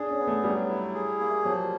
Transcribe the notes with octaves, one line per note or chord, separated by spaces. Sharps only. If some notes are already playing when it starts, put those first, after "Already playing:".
Already playing: D4 G#4
C#4
B3
A3
F#3 G3
E4
G#4
A#3
F3 F#3